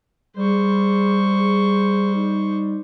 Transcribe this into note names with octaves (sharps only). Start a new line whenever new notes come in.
G3 G#4 C5 C#6
G#4
D#4